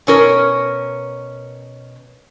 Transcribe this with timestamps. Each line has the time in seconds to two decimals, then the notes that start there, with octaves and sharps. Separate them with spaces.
0.07 B2 C#4 A#4